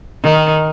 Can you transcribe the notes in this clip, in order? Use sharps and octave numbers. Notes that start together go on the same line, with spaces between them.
D#3